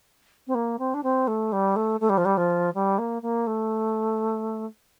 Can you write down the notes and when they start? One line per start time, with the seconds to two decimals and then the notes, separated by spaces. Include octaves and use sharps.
0.47 C4
0.54 A#3
0.79 C4
0.94 D4
1.03 C4
1.27 A3
1.52 G3
1.76 A3
2.00 A3
2.09 G3
2.17 F3
2.25 G3
2.37 F3
2.74 G3
2.98 A#3
3.22 A#3
3.47 A3